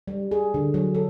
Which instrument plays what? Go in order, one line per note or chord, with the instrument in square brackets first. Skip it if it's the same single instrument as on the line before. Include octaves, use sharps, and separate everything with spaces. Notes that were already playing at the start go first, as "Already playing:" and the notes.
[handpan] G3
G#4
D3
F#3
A4